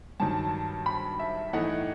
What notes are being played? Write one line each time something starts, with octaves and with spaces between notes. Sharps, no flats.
G2 D#3 F#3 A5
B5
E5
A2 E3 A3 D#4 F#5